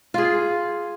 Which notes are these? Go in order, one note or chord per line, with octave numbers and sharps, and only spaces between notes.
F4 G#4